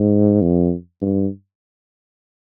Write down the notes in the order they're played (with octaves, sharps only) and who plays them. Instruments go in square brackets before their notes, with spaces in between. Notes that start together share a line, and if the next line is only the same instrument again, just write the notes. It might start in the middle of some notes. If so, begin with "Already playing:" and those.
Already playing: [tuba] G#2
F2
G2